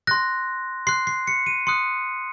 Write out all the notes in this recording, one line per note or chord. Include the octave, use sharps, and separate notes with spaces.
C6 F#6 A#6
C6 F#6 C7
C7
C#7
D#7
C6 D#6 F#6 C#7